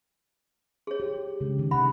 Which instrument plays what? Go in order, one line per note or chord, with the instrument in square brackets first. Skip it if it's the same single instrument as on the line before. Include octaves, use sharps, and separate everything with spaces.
[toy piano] G#4 C#5
[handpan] G4
C#3 G#3 D4
D#3
[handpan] C3 D#4 F#5 [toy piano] B5